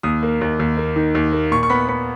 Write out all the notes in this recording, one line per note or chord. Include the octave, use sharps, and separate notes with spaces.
D#2 D#6
A#3
D#2
D#2
A#3
D#3
D#2
A#3
A#2 C#6
C#6
B3 B5
B3 B5